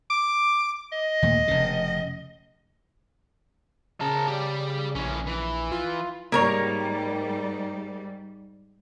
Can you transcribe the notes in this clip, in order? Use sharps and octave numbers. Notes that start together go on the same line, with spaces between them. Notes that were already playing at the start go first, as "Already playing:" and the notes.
D6
D#5
D#2 A#2 A3
F1 C#3
C#3 A#4 A5
G4 D5
A#1 E3 C#4
E3
F4
G#2 G3 A#3 A#4 C#5